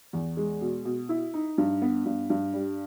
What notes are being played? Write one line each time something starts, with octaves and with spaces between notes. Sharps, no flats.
E2
G#3
B2
B2
E4
D#4
G2
B3
G2
G2
G3